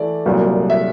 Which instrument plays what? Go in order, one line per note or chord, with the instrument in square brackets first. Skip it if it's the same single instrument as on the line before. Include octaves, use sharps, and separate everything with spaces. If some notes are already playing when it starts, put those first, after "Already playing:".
Already playing: [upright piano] E3 A3 D5
C2 A#2 F#3 A3
E5